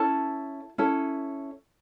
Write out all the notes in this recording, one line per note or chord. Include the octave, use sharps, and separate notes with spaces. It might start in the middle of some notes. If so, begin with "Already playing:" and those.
Already playing: C#4 E4 A4 A5
C#4 E4 A4